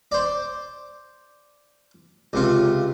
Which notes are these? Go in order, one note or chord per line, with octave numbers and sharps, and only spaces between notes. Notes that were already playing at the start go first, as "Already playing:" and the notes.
C5 D5
C#2 C3 F4